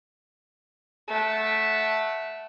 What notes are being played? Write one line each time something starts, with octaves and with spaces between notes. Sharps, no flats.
A3 F#5